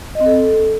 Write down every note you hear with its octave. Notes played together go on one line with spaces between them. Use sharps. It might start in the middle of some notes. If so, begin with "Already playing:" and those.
D#5
C4
A4